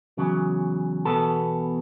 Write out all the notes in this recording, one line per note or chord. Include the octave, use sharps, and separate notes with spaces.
E2 C#3 F#3
E2 B2 B3 A4